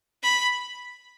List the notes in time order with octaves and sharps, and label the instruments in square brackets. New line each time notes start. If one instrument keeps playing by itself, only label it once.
[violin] B5